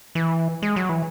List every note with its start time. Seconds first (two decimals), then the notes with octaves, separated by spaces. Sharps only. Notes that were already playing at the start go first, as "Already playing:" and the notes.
0.15 E3
0.62 G#3
0.76 F#3
0.89 E3